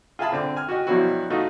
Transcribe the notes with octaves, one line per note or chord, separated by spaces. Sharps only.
F4 G#4 E5 G#5 A5 B5
D3 C4 D6
G#5 F6
F#4 G4 D#5
G2 B2 F3 F#3 E4 F#4
A3 D#4 F4 F#4